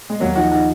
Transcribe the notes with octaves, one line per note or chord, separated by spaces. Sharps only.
G#3
D#2 F#3 A#3
F3 D#4 F#4
D#4 F#4